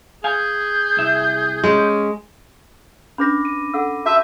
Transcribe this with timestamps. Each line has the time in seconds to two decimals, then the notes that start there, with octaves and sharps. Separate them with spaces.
0.24 G#4 F5 G#5 G6
0.97 C2 E5
1.64 G#3 C#4
3.18 C#4 D4 B4 B5 D6 A#6
3.45 D#7
3.74 A4 F#5 E6
4.06 F#4 E5 A5 E6 G6